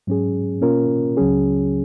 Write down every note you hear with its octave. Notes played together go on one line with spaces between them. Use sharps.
G#2 F#3 C#4 G#4
B2 A#3 C#4 F4 A#4
C#2 C#3 F#3 C#4 G#4